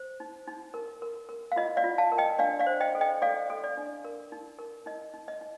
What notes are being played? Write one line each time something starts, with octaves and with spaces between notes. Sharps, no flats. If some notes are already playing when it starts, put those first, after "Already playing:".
Already playing: C5
D#4
D#4
A#4
A#4
A#4
F5
F4 D#5
D5 F5
F4
F5 A5
A#4
D#5 G5
D4 D5 F5
D5 F5
C5
D#5 G5
A4
D#5 G5
A4 D5 F5
A4
D5
D4
A#4
D#4
A#4
D#4 D#5
D#4
D#5
D#4